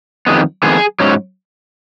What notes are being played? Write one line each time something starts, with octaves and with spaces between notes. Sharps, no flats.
F2 D#3 G#3 B3
F2 D#3 G#3 B3 G#4
G#2 F#3 C#4